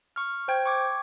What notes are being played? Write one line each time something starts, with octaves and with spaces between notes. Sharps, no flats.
C#6 F6
C5 G5 G#6
C#6 D6 G#6